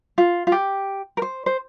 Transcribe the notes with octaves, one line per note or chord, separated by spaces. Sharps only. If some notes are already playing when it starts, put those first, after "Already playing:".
F4
F4
G4
A#4
C5
C5